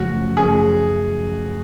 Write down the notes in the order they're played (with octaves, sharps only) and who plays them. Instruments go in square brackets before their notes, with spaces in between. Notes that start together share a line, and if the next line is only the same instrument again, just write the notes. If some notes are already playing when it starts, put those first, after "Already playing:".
Already playing: [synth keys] F#2 C#3 F3 A3 C#4 [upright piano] F#4
[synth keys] F#2 C#3 F3 A3 C#4 [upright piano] G#4